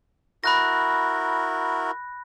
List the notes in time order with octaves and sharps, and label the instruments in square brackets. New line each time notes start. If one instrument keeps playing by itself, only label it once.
[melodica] E4 F#4 A#4 [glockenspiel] B5 F#6 A#6